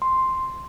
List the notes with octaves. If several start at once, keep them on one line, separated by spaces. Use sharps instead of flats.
C6